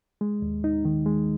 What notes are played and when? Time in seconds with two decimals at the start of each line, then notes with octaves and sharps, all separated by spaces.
0.21 G#3
0.42 D#2
0.64 D#4
0.85 D#3
1.06 G#3